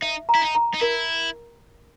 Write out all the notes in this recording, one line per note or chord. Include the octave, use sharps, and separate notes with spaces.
D#4 E5
A#5
E4
D#4
A#5
D#4
E4 A#4